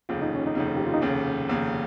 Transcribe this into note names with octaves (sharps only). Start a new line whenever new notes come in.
F1 D#2 C#3 F4
D#4
C#4
D#4
F1 D#2 C#3
G4
F4
D#4
F1 D#2 C#3 C#4
F1 D#2 C#3